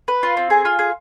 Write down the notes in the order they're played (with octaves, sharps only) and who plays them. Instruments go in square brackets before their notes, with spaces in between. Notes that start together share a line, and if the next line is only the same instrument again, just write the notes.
[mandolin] B4
F4
C4
G#4
F4
G#4